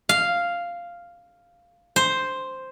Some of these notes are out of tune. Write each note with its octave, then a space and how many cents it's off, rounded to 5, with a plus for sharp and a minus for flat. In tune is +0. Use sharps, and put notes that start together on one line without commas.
F5 -5
C5 +0